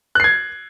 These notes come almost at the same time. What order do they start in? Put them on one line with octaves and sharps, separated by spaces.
F#6 C7 G#6